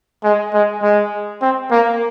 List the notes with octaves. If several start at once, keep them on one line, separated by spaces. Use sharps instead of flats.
G#3
G#3
G#3
C4
A#3